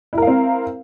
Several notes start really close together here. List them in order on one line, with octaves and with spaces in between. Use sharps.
E4 A#4 F5 C4